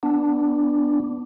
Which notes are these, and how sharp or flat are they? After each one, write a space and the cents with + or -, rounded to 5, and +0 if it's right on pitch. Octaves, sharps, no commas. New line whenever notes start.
B3 +0 D4 +0